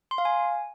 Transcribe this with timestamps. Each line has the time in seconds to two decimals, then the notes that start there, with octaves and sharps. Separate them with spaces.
0.11 C6
0.18 F5
0.25 G#5